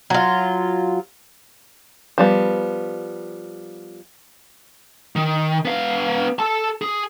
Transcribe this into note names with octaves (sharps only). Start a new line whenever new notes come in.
F#3 F4
F3 G3 B3
D#3
B3 F5
A4 A5
G#4